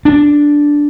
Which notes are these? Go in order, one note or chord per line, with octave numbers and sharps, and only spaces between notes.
D4